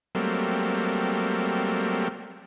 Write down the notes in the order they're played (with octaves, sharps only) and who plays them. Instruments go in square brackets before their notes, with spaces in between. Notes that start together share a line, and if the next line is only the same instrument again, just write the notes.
[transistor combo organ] F#3 G3 A3 A#3 C4